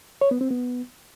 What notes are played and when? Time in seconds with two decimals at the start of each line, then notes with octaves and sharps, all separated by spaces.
0.21 C#5
0.31 B3
0.41 C4
0.50 B3